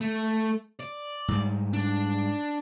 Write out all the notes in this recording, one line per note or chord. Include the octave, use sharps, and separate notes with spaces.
A3
D5
G#2 G3
D4